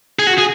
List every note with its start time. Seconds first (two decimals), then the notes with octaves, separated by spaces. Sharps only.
0.19 G#4
0.27 F#4
0.38 G#4